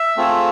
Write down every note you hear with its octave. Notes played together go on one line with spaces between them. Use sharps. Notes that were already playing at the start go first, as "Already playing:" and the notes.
Already playing: E5
A3 C4 F4 G#4